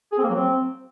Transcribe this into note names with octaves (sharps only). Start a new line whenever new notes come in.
G#4
C4
A#3
F#3
C4